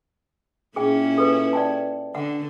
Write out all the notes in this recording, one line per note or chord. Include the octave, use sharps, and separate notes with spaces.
A#2 C#4 E4 G#4 G5
A4 B4
D5 G5 A5
D3 F#5